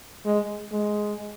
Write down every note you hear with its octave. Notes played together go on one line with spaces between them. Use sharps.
G#3
G#3